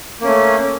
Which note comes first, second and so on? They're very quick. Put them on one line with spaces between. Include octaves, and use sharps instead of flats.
A#3 C#4 A3